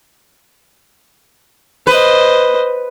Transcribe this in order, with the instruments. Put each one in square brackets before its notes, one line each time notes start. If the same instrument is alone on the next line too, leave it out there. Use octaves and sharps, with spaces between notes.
[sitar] B4 [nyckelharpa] C5 D#5